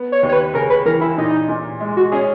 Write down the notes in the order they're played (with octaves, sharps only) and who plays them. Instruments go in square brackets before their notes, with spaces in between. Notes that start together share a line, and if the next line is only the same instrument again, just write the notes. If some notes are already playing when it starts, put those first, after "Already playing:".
Already playing: [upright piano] B3
[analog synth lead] C#5
[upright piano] D#2
[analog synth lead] C#5
B4
[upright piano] C#3 [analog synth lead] A#4
[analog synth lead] B4
[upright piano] E3 [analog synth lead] A#4
[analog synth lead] E4
[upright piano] A#2 [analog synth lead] D#4
[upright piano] A#2
G#3
[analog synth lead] F#4
[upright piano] C#4 [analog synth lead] G#4